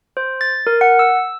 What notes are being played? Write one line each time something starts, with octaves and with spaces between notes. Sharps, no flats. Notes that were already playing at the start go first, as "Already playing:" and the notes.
C5
A6
A#4
F#5
E6